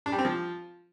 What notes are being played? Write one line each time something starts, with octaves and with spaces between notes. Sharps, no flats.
D4
G3
C4
F3